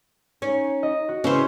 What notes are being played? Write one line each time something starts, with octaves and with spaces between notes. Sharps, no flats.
C#4 D#4
D#5
F#4
C#3 E3 C#4 C5